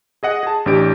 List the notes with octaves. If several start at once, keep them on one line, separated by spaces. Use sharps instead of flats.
G#4 D#5 F#5 D#6
G#4 A5
A1 D4 G4 D7